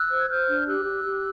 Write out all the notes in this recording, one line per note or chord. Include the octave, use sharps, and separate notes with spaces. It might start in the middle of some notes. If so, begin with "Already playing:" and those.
Already playing: E6 F#6
C5
G#6
C5 F6 G6
D4
G4 E6 F#6
G4
G4